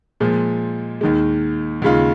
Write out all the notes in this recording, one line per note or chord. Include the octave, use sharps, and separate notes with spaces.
A#2 F3 G#3
D#2 D#3 G#3
D#2 C#3 G#3 F4